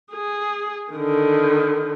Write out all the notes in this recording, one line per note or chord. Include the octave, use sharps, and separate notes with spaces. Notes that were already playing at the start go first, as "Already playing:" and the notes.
G#4
D3 D#3